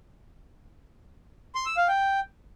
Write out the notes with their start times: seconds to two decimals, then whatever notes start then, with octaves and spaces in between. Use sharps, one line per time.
1.55 C6
1.66 E6
1.77 F5
1.88 G5